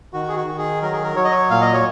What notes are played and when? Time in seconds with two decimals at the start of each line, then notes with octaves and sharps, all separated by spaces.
0.13 D#3 F#4
0.29 G#4
0.36 F#4
0.47 D#3
0.58 G#4
0.82 F#3 A#4
0.93 G#4
1.03 A#4
1.16 F#3 C#5
1.24 D#5
1.31 C#5
1.50 A#2 F5
1.61 D#5
1.73 C#5